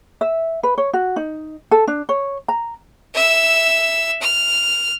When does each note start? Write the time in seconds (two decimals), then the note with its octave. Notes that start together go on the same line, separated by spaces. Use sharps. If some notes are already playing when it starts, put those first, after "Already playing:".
0.21 E5
0.63 B4
0.78 C#5
0.93 F#4
1.16 D#4
1.71 A4
1.87 D4
2.09 C#5
2.48 A#5
3.14 E5 E6
4.22 F6